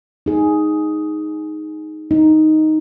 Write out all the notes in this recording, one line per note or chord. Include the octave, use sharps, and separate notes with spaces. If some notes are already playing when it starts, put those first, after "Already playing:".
D#4 G#4
D#4